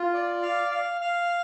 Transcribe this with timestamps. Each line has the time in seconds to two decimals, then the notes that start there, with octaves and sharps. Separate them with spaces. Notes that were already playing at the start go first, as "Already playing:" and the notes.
Already playing: F4
0.14 D5
0.42 F5
0.71 F5
1.01 F5